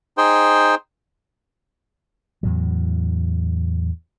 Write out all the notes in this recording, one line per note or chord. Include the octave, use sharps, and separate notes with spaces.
D#4 G#4 C5 G5
E2 A2 F#3